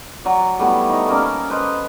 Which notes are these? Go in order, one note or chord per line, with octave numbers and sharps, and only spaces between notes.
F#3 D5
G3 A3 B3 E4
D#4 C#5 D#5
A#3 C#4 A#4 D5
B4 C5 D#5